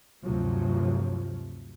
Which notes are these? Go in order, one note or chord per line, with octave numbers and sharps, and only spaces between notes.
D2 G2 C3 F3 F#3